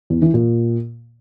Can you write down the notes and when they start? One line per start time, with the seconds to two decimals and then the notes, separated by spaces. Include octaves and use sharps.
0.10 E2
0.22 E3
0.34 A#2